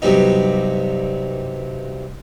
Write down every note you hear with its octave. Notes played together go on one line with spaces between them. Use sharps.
G2 C3 F#3 B3 D#4